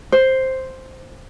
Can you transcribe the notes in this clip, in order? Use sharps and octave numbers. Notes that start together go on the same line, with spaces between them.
C5